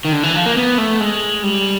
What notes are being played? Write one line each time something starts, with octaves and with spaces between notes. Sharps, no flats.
D#3
D3
E3
F3
A#3
B3
A3
G#3
G3